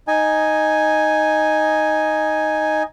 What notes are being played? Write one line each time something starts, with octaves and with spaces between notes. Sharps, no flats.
D#4 G#5